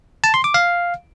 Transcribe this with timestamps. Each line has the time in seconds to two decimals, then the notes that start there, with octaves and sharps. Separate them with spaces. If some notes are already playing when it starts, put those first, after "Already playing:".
0.24 A5
0.34 C6
0.44 D6
0.54 F5